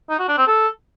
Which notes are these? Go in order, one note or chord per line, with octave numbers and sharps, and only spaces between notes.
D#4
F#4
D4
C4
A4